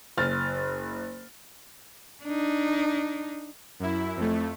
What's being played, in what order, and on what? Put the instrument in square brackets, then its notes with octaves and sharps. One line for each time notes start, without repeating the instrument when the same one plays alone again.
[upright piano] F#1 F6 A6
[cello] D4 D#4
[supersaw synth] F#2 E4
F2 A3